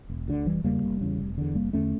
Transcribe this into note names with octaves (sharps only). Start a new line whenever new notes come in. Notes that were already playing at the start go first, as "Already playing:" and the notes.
E1
D2 D3
F1 E3 G3
E2 C#3 G3 A#3
F1
E2 C#3
F1
E2 D3
F1 G3 A#3
E2 D3 A3 C#4